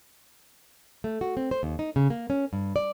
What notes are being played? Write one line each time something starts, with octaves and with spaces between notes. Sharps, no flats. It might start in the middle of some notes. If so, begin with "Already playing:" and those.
A3
F#4
C4
C5
D#2
D#4
C#3
A#3
C#4
G2
D5